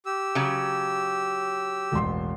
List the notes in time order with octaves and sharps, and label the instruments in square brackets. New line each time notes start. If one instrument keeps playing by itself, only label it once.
[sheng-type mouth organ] G4 E6
[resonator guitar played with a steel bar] C#3 F#3
[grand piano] E1 A1 C6